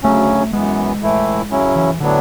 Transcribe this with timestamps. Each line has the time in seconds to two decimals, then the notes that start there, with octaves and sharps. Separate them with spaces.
0.04 D2 C#3 F#3 A3 C#4
0.53 F#2 E3 G#3 B3
1.02 A2 E3 A3 E4
1.51 F#2 C#3 F#3 C#4 E4
1.76 E3
2.00 A2 D3 F#3 B3 D4